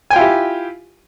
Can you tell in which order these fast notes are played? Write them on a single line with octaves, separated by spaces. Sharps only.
G#5 G5 F4 E4 G4